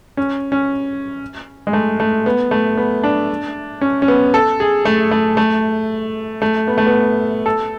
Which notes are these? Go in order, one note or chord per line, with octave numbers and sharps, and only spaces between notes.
C#4
C#4
G#3
A3
A3
B3
A3
B3
D4
C#4
C#4
B3
A4
G#4
A3
A3
A3
A3
B3
A3
B3
A4